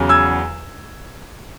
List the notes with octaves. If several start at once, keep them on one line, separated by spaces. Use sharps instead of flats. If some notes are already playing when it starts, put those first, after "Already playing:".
Already playing: E2 C#3 F#3
E6 G#6